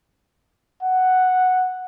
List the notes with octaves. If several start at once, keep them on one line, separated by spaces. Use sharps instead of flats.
F#5